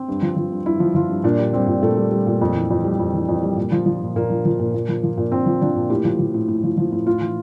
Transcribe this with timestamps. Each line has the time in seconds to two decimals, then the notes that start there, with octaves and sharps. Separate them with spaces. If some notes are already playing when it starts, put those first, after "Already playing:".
Already playing: C4
0.08 G2
0.22 F3
0.36 F3
0.52 G2
0.66 G2 E4
0.80 F3
0.95 F3 F4
1.10 G2
1.24 A#2 D4
1.38 G3
1.53 G3 C4
1.67 A#2
1.82 A#2 A3
1.97 G3
2.11 G3
2.27 A#2
2.41 F2
2.55 E3
2.71 F2
2.84 G3
3.00 F2
3.14 E3
3.29 F2
3.43 G3
3.57 A#2
3.72 F3
3.86 F3
4.02 A#2
4.16 A#2 A#3
4.30 F3
4.45 F3
4.59 A#2
4.74 A#2
4.89 F3
5.03 F3
5.18 A#2
5.32 A#2 C4
5.46 F3
5.61 F3 D4
5.76 A#2
5.90 A2 G4
6.05 F3
6.19 F3
6.34 A2
6.48 A2
6.64 F3
6.78 F3
6.92 A2
7.06 A2 F4
7.21 E3